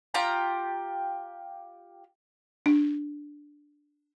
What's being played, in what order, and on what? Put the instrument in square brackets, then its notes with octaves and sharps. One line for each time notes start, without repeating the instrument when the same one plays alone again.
[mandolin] F4 G4 G5 A#5
[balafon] D4